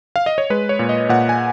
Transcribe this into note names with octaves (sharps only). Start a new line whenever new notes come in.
F5
D#5
C#5
G#3 B4
C#5
A#2
D#5
A#2 F#5
G#5